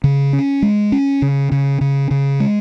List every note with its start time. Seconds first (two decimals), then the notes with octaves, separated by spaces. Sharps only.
0.04 C#3
0.33 C#4
0.62 G#3
0.92 C#4
1.22 C#3
1.52 C#3
1.81 C#3
2.11 C#3
2.40 G#3